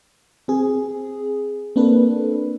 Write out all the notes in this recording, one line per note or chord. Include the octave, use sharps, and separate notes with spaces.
C4 G#4
A#3 C4 D4 A4 B4